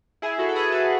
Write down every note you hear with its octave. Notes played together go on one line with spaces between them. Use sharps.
E4 G#4
F#4 A4
A4
G#4 B4
F#4 A4